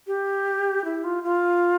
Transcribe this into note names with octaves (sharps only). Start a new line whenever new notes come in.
G4
E4
F4
F4